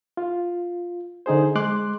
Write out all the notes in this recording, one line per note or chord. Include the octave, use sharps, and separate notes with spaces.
F4
D3 D#4 G#4 C5
G#3 C6 D6 F#6